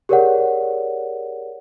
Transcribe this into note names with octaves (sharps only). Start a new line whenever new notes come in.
G4 G#4 A#4 C#5 D5 F#5